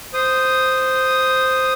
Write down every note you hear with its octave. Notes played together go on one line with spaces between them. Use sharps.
C5 D#6